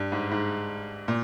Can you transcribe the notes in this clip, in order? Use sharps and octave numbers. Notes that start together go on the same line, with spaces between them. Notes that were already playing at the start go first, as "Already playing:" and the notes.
Already playing: G2
G#2
G#2
A#2